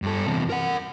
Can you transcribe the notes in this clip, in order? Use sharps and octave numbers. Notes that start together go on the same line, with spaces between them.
G2 A4
E2 C3
A#4 F#5